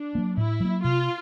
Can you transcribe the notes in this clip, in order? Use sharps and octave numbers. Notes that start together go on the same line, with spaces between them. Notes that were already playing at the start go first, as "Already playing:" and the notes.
Already playing: D4
F#3 A#3
A2 E4
F#3 A#3
C3 F4